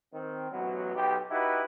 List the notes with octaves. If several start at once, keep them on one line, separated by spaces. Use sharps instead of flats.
D#3 C4
A1 B2 F#3
B1 G4
D#4 E4 F#4 G4 B4